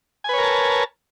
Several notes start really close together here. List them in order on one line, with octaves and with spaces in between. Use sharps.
G#5 B4 C#5 A#4 A5